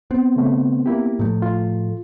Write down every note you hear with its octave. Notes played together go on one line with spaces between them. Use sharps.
B3 C4
C#3 A3
A#3 E4 G4
A2 F3 A3
F4